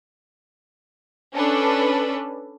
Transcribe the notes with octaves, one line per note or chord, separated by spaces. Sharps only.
C#4 D4 A4 B4